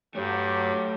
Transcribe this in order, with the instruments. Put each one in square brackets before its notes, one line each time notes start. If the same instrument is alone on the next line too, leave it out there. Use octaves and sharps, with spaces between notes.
[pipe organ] G2 [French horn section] F#3 [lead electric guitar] A3 C#5 [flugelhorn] G4